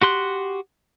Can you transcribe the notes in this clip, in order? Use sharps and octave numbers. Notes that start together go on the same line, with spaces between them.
F#4 G4 C6 F#6